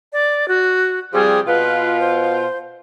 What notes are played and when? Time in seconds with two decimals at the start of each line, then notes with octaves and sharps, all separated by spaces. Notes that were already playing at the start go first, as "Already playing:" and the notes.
0.13 D5
0.48 F#4
1.13 C3 F3 G3 G#4
1.47 B2 F4 B4
2.00 C5